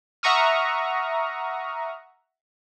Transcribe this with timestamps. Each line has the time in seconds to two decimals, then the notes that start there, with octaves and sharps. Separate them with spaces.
0.23 E5 F#5 A#5 C#6 D#6 F6